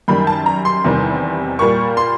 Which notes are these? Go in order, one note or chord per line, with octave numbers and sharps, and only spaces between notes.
F#2 D#3 G3 B5
A5
A#5
C6
E2 C3 D#3 G3
A#2 G3 A#3 C#6
C6